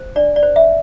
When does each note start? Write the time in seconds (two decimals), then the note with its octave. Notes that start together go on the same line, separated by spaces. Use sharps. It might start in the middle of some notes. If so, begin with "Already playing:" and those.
Already playing: C5
0.16 D4 D5
0.36 D5
0.43 C5
0.56 E5